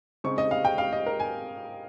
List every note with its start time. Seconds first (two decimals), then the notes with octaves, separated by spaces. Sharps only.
0.24 C#3 G#3 C4 D#4 C#6
0.38 D#5
0.51 F5
0.65 G5
0.78 F5
0.93 D#5
1.06 A#4
1.20 G#5